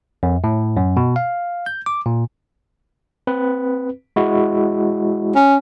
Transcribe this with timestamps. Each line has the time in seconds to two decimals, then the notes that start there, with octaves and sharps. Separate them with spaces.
0.23 F2
0.44 A2
0.77 F#2
0.97 B2
1.16 F5
1.66 G6
1.86 D6
2.06 A#2
3.27 C4 B4
4.16 G#3 E4 F#4
5.35 C#4